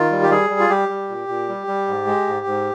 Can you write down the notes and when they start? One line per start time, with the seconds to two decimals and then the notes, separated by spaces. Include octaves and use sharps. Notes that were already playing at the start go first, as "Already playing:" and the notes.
Already playing: D#3 F4
0.11 G3
0.22 G4
0.30 G3 G#4
0.50 G3
0.59 F4
0.70 G3 G4
0.89 G3
1.09 A#2
1.28 A#2
1.49 G3
1.67 G3
1.88 G#2
2.07 G#3
2.27 G#2
2.46 G#2